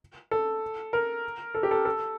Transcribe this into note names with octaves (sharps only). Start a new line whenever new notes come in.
A4
A#4
A4
G4
A4
A4